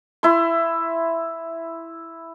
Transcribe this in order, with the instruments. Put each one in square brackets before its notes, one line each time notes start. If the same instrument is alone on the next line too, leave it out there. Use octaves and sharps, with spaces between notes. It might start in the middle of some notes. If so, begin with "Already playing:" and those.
[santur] E4 C6